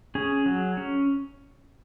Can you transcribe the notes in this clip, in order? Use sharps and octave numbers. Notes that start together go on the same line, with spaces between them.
C#4 G#4
F#3
C#4